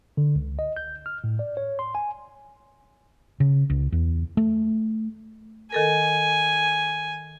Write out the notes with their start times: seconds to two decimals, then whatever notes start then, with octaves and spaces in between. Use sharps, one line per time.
0.17 D3
0.35 C#2
0.59 D#5
0.77 G6
1.06 F6
1.24 A2
1.39 D5
1.57 C#5
1.79 C6
1.95 G#5
3.40 C#3
3.70 C#2
3.92 E2
4.37 A3
5.73 D#3 A4 A#4 G#5